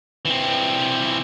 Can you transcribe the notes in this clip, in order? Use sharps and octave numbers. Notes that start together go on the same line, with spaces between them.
E3 C4